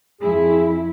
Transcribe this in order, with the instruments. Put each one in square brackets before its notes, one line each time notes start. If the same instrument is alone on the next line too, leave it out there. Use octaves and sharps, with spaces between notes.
[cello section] F2 E4 [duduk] G#4